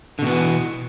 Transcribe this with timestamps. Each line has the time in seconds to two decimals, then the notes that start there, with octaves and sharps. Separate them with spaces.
0.19 D3
0.22 B2
0.26 B3
0.30 E3